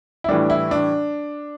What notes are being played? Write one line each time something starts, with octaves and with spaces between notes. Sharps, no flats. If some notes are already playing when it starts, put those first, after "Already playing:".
E4
A2 E3 G3 D4
E4
D4